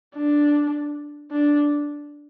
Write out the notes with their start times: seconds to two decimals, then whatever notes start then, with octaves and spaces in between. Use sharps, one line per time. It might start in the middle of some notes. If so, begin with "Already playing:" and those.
0.16 D4
1.31 D4